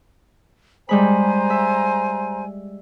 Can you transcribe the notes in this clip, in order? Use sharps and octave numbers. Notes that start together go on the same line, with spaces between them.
G3 G#3 C5 G#5 A#5 B5
E5